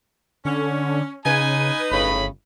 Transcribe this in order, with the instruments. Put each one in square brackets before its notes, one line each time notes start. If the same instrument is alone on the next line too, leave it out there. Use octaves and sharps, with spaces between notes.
[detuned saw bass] D3 [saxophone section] C#4
[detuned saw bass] C#3 [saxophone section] D#4 B4 [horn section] G#5
[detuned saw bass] G1 [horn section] A2 C#3 B5